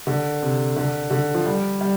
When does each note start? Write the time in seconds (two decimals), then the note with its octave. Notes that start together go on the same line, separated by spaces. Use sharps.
0.07 D3
0.42 C3
0.76 D3
1.11 D3
1.35 F3
1.46 G3
1.81 G3